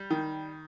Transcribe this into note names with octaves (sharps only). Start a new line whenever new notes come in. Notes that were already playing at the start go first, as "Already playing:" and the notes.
Already playing: G3
D#3